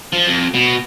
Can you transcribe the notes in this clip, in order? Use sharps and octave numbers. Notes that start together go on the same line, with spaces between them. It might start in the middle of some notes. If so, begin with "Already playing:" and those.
F3
F2
B2